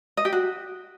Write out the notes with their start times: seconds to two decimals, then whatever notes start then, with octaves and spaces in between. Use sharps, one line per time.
0.17 D#5
0.25 G4
0.33 F#4